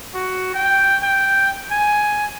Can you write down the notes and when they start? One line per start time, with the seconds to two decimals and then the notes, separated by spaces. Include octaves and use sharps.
0.14 F#4
0.54 G5
1.02 G5
1.71 G#5